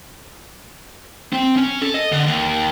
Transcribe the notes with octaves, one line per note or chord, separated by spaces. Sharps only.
C4
C#4
A4
D#5
D3
D#2